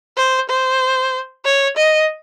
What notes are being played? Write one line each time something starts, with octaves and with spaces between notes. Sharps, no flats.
C5
C5
C#5
D#5